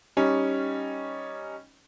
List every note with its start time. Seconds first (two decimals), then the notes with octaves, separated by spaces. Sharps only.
0.17 G3 C#4 D#4